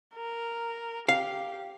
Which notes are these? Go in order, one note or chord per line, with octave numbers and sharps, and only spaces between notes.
A#4
G4 F5